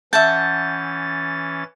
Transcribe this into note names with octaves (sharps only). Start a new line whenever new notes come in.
E3 C#4 E5 F#5 A5 G6 A6